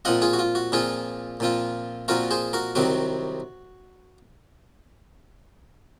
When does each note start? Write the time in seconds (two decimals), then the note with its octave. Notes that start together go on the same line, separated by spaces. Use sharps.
0.05 A#2 F3 C4 F4 D#5 F#5
0.22 F4 G#4
0.33 F#4
0.39 F4
0.55 F#4
0.72 A#2 F3 C4 F4 G#4
1.40 A#2 F3 C4 F4
2.08 A#2 F3 C4 F4 F#4 A#4
2.31 G#4 C5
2.53 F#4 A#4
2.75 C2 C3 D#3 F#3 C4 F#4